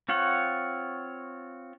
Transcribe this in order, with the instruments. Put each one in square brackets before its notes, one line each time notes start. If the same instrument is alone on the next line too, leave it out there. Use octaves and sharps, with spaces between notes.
[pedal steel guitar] C4 F4 C#5 F#5